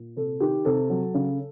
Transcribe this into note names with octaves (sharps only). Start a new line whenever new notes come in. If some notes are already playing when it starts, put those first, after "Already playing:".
Already playing: A#2
C3 A4
D#3 G4
C3 A4
F#3
C#3